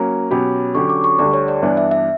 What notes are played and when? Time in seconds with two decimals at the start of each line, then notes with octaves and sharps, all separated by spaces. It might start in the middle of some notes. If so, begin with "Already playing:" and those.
Already playing: F#3 A#3 C#4 A#5
0.31 B2 F#3 C#4 G4 B5
0.75 D3 F#3 C#4 G4 C#6
0.89 D6
1.04 C#6
1.19 D2 D3 G3 D5
1.33 C#5
1.48 D5
1.62 G2 E3 B3 D4
1.77 E5
1.91 E5